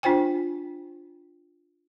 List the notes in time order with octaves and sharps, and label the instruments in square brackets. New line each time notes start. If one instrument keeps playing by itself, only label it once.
[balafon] D4 F4 C5 G5 G#5